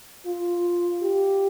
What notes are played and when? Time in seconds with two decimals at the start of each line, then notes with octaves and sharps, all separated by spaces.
0.26 F4
1.02 G4